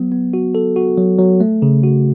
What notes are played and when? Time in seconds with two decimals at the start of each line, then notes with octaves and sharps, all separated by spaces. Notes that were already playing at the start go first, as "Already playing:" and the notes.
Already playing: F#3 B3
0.12 B3
0.34 F#4
0.55 A4
0.76 F#4
0.98 F#3
1.19 F#3
1.40 A3
1.62 C#3
1.83 F#4